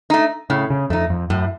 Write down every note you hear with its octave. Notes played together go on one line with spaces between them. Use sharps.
A3 D#4
A2 C#3
C#3
F2 A3 D#4
F2
F#2 A2